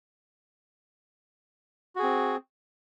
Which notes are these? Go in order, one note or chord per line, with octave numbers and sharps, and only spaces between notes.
C4 F#4 G#4